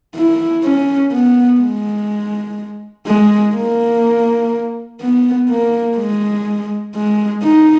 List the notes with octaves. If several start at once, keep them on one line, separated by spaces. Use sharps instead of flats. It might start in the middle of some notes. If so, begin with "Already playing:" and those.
E4
C#4
B3
G#3
G#3
A#3
B3
A#3
G#3
G#3
D#4